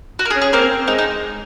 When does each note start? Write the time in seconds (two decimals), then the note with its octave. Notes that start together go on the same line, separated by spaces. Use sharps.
0.19 F#4
0.25 A#4
0.30 G#4
0.36 C#4
0.42 G#4
0.53 A#3 C4 A#4
0.70 C4
0.88 G#3 D#4
0.98 D#4